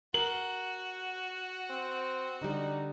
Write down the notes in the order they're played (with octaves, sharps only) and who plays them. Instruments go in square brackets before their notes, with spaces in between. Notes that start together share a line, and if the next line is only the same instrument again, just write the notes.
[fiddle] F#4 [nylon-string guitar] A#4 [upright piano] F#7
[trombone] C4
[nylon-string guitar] D3 G3 [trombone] D#4